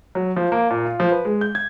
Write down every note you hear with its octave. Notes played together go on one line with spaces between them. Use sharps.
F#3
F3
A#3
A#2
F4
F3
B4
G#3
G6
G#6